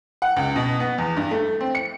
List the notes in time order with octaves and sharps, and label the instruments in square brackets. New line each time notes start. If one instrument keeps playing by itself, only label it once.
[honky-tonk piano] F#5
C#2
B2
B3
E2
G2
A3
C4
C#7